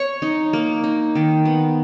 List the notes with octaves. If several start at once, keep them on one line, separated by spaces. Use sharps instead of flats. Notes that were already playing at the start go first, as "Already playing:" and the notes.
Already playing: C#5 C#6
D#4
A#3
D#4
D#3
B3